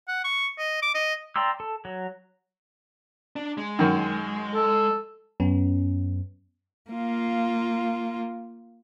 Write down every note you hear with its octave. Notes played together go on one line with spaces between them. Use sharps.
F#5
C#6
D#5
D6
D#5
D5 G5 A#5 C6 E6
A4
F#3
D4
G#3
F#2 D#3
A4
F#2 B3 C#4
A#3 F4